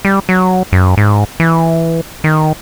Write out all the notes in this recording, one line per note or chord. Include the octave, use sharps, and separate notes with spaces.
G3
F#3
F#2
G#2
E3
D#3